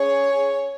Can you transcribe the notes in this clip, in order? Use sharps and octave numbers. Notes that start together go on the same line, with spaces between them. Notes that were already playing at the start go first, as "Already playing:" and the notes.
Already playing: C#4 G#4 C#5